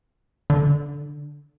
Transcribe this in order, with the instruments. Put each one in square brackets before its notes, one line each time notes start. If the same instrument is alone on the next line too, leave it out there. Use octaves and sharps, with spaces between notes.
[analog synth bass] D3